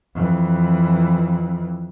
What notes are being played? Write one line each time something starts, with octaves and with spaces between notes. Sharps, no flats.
F2 E3